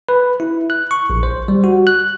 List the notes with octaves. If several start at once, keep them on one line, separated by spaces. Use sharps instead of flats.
B4
E4
F#6
C#6
A#1
C5
G3
F#4
F#6